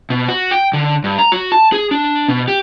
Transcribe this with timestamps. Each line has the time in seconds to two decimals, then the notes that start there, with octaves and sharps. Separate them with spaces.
0.10 B2
0.29 F#4
0.51 G5
0.73 D3
1.04 G2
1.19 A#5
1.32 F#4
1.52 A5
1.73 G#4
1.91 D4
2.28 B2
2.48 G4